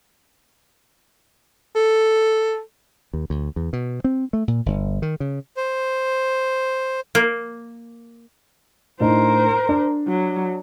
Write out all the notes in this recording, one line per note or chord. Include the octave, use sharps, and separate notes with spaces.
A4
D#2
D2
E2
B2
C4
A3
A#2
G1
D#3
C#3
C5
A#3
A2 D4 D#4 A#4 C5
D4
F#3